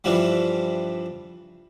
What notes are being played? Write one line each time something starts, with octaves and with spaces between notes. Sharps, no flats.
G2 E3 F3 G3